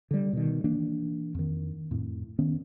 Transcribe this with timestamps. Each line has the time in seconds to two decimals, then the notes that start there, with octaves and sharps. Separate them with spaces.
0.11 D3 G3
0.33 B2 D#3
0.64 E3 A#3 D4
1.35 F2 D#3
1.91 F2 A2
2.39 D#3 B3 C#4